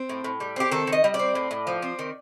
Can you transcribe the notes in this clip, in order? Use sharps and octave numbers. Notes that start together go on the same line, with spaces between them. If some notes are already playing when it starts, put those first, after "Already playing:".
Already playing: C4
A2
A2
G3
C4 G4
D#3 A4
D#3
D#5
G3
D5
C4
A2
A2
F3
C4
D#3